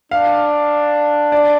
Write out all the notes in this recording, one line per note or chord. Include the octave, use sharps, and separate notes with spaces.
D4 F5
D5